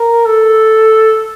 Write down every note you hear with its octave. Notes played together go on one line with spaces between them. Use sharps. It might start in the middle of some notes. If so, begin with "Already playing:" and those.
Already playing: A#4
A4